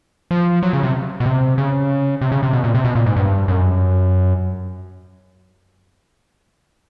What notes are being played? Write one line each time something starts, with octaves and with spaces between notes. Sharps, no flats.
F3
F#3
C#3
C3
B2
C3
C#3
C3
C#3
C3
B2
A#2
C3
B2
A#2
G#2
G2
F#2